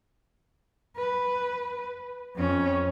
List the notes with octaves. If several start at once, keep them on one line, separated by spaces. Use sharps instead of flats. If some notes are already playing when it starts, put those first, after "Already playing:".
B4
F2 C#4